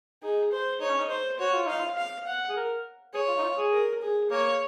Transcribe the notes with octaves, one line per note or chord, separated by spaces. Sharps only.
D#4 G#4
C5
D#4 C#5
C#4
D#4
C5
F#4 C#5
F4
D#4 F5
F4
F5
F#5
G#4
A#4
G#4 C#5
F4
D#4
F4
G#4
A#4
G#4
A#3 C#5